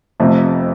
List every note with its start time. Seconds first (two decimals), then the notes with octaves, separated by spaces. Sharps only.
0.20 F1 F2 C3 F3 A3